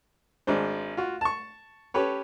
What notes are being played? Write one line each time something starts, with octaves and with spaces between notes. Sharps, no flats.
G#1 G#3 D4 C5
F4 F#4
A5 C#6
C#4 G4 A4 B4 C#5